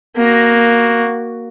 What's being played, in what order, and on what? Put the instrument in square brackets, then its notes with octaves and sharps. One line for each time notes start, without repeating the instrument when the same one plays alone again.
[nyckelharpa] A#3 F#4